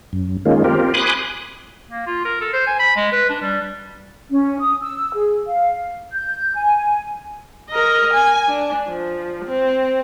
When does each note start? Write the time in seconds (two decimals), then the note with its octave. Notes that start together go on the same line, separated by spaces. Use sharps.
0.13 F#2
0.45 D#3 G#3 A#3 C#4 F4
0.64 C4 F4 G4 A#4
0.94 G#5 B5 C6 D6 D#6 F#6
1.90 A#3
2.07 F4
2.25 A#4
2.41 A4
2.53 C5
2.67 G#5
2.80 B5
2.96 G#3
3.12 B4
3.29 D4
3.42 G3
4.31 C#4
4.59 D#6
4.81 E6
5.14 G#4
5.46 F5
6.12 G6
6.55 G#5
7.70 A#4 D#5
8.14 G#5
8.48 D4
8.88 F3
9.46 C4